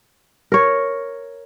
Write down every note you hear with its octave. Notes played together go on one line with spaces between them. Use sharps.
A#4 C#5